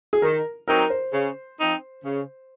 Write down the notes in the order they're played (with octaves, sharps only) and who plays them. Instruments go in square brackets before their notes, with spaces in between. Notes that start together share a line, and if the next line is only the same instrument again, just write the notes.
[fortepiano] G#4
[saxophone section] D#3 [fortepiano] A#4
[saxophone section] F#3 C4 D#4 [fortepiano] A#4
[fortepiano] C5
[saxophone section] C#3
F3 C4 D#4
C#3